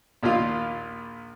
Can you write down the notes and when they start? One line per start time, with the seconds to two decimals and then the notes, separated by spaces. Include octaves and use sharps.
0.23 A#1 D#2 A#2 F4 F5